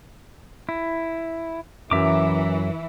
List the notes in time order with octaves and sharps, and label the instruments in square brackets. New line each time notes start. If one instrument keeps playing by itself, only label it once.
[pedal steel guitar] E4
[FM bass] F#2 [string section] E3 [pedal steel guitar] E5 A#5 D6